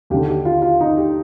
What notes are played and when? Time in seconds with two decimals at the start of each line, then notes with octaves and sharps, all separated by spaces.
0.10 D#2 D3 G4
0.28 G4
0.45 F4
0.62 F4
0.80 D#4
0.97 G4